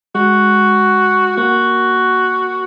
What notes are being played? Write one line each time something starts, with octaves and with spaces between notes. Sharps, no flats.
G#3 F#4
A#3 F#4